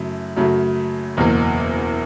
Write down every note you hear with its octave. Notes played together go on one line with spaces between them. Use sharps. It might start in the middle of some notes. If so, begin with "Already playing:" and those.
Already playing: F#2 C#3 F#3 A3 E4
F#2 C#3 F#3 A3
F#1 E2 B2 F#3 A#3